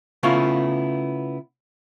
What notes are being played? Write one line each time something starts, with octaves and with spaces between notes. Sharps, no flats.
C#3 A3 B3 C#4 E4 F4